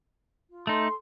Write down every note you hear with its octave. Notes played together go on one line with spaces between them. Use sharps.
F4
A3 D#4 A4 A5 C6